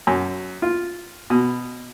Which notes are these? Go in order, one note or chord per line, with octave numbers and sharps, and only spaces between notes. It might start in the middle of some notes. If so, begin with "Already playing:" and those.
F#2
F4
B2